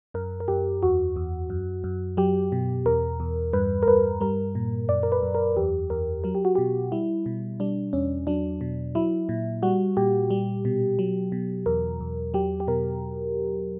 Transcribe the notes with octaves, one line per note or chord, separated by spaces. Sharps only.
F#2 A#4
A#4
F#2 G4
E2 F#4
E2
F#2
F#2
F#3 G4
B2
E2 A#4
E2
G2 B4
A#4
G2 B4
G3 A#4
A#2
F#2 D5
A#4
B4
F#2
A#4
E2 G4
E2 A#4
F#3 A#4
G4
F#4
B2 G4
G3 E4
B2
G3 D4
E2 C#4
F#3 D4
B2
F#3 E4
A#2
G3 F#4
A#2 G4
G3
B2
F#3
B2
E2 A#4
E2
F#3 G4
G4
B2 A#4